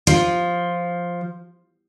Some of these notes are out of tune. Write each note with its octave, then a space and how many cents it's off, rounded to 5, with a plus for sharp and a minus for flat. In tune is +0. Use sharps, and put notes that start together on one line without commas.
F3 +0